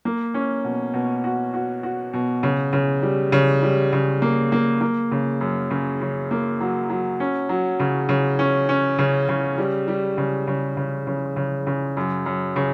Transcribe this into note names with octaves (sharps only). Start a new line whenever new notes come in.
A#3
C#4
B2
B2
F#4
F#4
F#4
B2
C#3
C#3
G3
C#3
G3
C#3
A#3
A#3
A#3
C#3
F#2
C#3
C#3
A#3
F#3
F#3
C#4
F#3
C#3
C#3
C#4
C#4
C#3
C#3
G3
G3
C#3
C#3
C#3
C#3
C#3
C#3
F#2
F#2
C#3